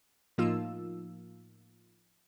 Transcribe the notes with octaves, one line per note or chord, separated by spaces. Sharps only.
A2 F3 A#3 D#4 F4 E6